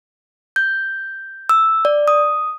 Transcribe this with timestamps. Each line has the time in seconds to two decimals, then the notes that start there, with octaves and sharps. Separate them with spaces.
0.56 G6
1.49 E6
1.85 D5
2.08 D#6